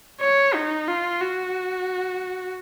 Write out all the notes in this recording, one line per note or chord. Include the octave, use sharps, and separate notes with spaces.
C#5
D#4
F4
F#4